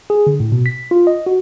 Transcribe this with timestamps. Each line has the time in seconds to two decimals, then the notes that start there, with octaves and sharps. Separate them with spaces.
0.10 G#4
0.27 D3
0.40 A2
0.52 B2
0.66 B6
0.91 F4
1.07 D#5
1.26 F#4